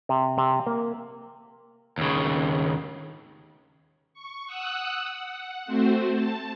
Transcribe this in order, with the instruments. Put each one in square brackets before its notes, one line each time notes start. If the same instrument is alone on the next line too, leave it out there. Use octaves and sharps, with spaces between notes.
[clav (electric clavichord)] C3
C3
A#3
[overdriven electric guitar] D#2 C#3
[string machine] C#6
F#5 D#6 E6 F#6
F#5
A3 C4 F#4 C5
A5